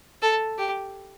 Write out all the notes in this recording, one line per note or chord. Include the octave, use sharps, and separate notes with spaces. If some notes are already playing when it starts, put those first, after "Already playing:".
A4
G4